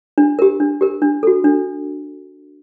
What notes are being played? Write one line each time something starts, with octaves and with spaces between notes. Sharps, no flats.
D4
G4 A#4
D4
G4 A#4
D4
F#4 A4
D4